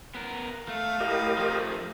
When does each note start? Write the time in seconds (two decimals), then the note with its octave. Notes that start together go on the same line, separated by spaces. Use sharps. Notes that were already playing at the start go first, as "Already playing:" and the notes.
0.15 B3 A#4
0.68 A3 F5
1.00 A2 G4 A#4 D#5
1.38 F3 A3